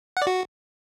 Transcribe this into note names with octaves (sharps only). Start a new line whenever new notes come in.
F#5
D5
F#4